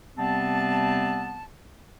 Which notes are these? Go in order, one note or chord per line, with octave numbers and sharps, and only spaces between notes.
C3 G3 B3 C4 A5